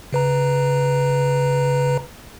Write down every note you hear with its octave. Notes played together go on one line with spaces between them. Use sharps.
C#3 B4 A#5